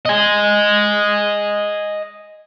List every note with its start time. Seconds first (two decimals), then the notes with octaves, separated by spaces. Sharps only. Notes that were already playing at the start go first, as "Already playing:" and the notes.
0.06 D#5 G#5